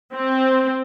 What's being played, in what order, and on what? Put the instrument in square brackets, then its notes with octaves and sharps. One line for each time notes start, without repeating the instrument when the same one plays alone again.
[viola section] C4